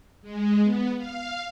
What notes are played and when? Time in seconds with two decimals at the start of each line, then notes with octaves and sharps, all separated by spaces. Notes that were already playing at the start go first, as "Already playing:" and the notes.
0.22 G#3
0.63 B3
0.97 F5